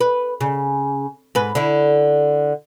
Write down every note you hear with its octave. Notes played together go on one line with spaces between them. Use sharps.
B4
C#3
G#2 B4
D3 E4